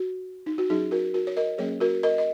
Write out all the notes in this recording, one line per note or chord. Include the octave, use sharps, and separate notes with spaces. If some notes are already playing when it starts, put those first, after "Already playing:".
Already playing: F#4
D#4
F#4
F#3 C#4 D#4 G#4
F#4 A#4
F#4 A#4
C#5
A#4 D#5
F#3 A#3 C#4 G#4 C#5
F#4 A#4
A#4 D#5
D#5